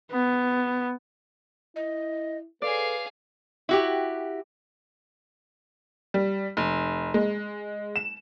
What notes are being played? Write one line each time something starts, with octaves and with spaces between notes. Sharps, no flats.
B3
E4 D#5
G#4 A4 B4 D5 F5
E4 F#4 G4
G3
F1
G#3
E7